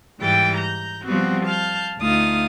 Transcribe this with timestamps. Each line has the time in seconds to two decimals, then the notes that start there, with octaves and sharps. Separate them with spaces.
0.18 G#2 E3 G3 G5 A6
0.56 A#5 G6
1.05 F3 G3 B3 C4 F#4
1.46 F5 A5 F6 G6
1.98 D2 A3 D#4 F4 F5 D#6